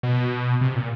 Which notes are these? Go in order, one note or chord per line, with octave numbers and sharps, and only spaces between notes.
B2
C3
A#2